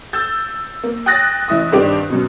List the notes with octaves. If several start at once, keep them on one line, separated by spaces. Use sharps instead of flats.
E6 G6 A6
A#3
G5 D#6 F#6 A6 A#6
A1 E4 D#6
G2 D#3 C4 D4 G4
F#2 B2